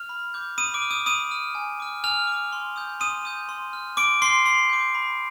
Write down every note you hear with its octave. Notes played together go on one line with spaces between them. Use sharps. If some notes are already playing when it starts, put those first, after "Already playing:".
Already playing: F6 F7
B5
D6 G6
B5 D#6 D#7
D6 D7
F6
D#6 D#7
B5 D#6 D#7
F6
G#5
D6 F6
G#5 F6 F7
D6
F6
C6
D#6 G6
C6 D#6 D#7
D#6 G6
C6
F6
C6 D6 D7
C6 F6 C7
B5 C6 C7
D6 G6
B5